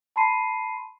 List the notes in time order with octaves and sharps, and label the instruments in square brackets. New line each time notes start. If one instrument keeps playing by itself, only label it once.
[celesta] A5 B5 C6 C7 D#7